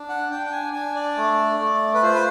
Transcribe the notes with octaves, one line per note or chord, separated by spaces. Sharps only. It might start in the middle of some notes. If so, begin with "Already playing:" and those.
Already playing: D4
F#5
D4 G5
G5
G#5
D4 G#5
D5
A3
A3
B4
F4 C5
B4